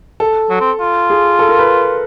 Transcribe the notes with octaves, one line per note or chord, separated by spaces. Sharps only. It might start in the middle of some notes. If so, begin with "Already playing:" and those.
A4
F#3
C4
F4
G#4
A4
A#4
B4